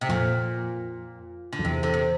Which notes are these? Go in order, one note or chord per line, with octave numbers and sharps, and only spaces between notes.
C3
F2 A#2
D3
F2
E2 C3
D3
C3